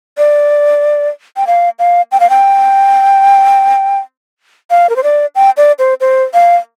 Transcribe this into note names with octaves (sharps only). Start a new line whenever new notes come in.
D5
G5
F5
F5
G5
F5
G5
F5
A#4
C5
D5
G5
D5
C5
C5
F5